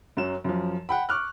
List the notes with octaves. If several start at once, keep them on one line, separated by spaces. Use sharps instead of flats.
F#2 F#3 E7
F#2 F3
F#5 G5 B5
C#6 D6 F6 F#6